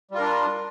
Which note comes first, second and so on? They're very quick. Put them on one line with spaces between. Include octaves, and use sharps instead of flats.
G3 F4 A#4 D4